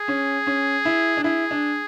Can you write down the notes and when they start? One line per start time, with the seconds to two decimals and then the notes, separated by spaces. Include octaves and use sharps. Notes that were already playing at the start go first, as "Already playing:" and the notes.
Already playing: G#4
0.08 C#4
0.47 C#4
0.85 E4
1.17 D4
1.24 E4 G#4
1.51 D4